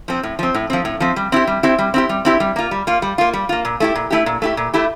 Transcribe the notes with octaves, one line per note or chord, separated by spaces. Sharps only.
F3 C4
A2
F3 C4
A2
F3 C4
A2
F3 C4
G3
C4 E4 G4
G3
C4 E4 G4
G3
C4 E4 G4
G3
C4 E4 G4
G3
A#3 F4
G3
A#3 F4
G3
A#3 F4
G3
A#3 F4
A#2
A3 E4 G4
A#2
A3 E4 G4
A#2
A3 E4 G4
A#2
A3 E4 G4